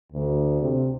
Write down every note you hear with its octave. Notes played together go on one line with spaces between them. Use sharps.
D2
C3